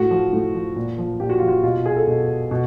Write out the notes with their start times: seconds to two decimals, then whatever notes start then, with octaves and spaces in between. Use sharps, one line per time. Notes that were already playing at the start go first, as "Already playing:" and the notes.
Already playing: A2 F#4
0.11 F3
0.33 A2
0.54 F3
0.76 A#2
0.98 F3
1.20 A#2 G4
1.29 F#4
1.39 F3 F4
1.48 F#4
1.63 B2 F4
1.86 G#4
1.96 A4
2.07 B2
2.51 B2